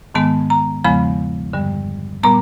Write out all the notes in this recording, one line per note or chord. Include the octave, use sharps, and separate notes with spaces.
G#2 D#3 G#3 B3 A5
A#5
E2 C#3 F3 G#3 B3 B5
G2 D3 G3
A#2 G3 B3 A#5